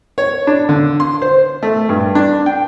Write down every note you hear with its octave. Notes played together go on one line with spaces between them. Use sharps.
C#5
D4
D3
C6
C5
A3
G2
D4
G5